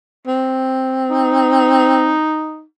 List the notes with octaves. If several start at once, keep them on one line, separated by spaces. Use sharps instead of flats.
C4
D#4